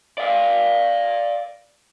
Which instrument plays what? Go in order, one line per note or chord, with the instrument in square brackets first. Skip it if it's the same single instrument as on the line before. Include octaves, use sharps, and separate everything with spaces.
[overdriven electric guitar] D5 F5